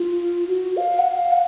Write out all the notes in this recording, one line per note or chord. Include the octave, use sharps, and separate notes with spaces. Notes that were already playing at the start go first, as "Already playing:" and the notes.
Already playing: F4
F#4
F5
F#5
F5
F#5